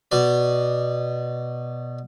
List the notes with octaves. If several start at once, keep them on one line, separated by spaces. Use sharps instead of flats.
B2 D5